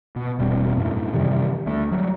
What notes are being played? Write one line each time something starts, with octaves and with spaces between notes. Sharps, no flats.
B2
E1 B2 G3 C4
F#2 A2
C3 D#3 E3 G3
D2 A3
F#3 G3